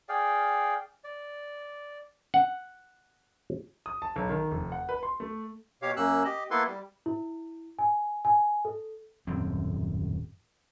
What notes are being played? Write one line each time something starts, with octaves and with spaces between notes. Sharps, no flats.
G#4 D5 F5 G5
D5
F#5
D#6
A5
B1
D#3
F1
F#5
B4
C6
A3
B2 G4 C#5 F5
F#2 A#3 C#4 E6 F#6
G4 D#5
A#3 B3 E4 A4 B4 C6
G3
E4
G#5
G#5
A4
D#1 F#2 A2 C4